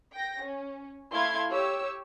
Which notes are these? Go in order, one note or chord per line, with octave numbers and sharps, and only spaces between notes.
G5 A#6
C#4
A3 E4 F5 C6 G#6
G4 C#5 E6